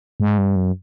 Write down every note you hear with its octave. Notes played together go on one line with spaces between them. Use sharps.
G#2
G2
F#2